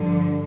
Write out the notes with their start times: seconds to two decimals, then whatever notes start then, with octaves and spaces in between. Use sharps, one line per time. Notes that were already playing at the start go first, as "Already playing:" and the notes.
Already playing: G2 D3 F3